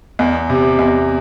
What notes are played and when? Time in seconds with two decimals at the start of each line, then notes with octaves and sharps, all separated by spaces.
0.19 E2
0.50 C3
0.79 E2